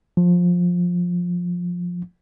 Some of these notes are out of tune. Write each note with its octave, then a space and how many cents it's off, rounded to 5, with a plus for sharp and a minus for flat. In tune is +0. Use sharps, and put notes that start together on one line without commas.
F3 +15